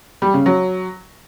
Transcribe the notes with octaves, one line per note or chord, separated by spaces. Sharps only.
G3
C#3
F#3